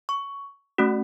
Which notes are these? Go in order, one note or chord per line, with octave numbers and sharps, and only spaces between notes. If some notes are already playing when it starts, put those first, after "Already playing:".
C#6
A3 C#4 F#4